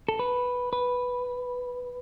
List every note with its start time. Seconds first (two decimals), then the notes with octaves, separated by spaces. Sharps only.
0.08 A4
0.19 B4
0.73 B4